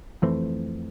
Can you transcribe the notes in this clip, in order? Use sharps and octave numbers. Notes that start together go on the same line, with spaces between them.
F2 E3 A3 C4